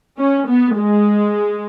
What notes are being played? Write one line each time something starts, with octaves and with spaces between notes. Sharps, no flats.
C#4
B3
G#3